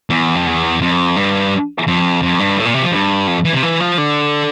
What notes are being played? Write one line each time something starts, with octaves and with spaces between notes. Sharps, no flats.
E2
F2
E2
F2
G2
F2
F2
G2
A2
A#2
C3
F3
G2
F2
E3
C3
E3
F3
D3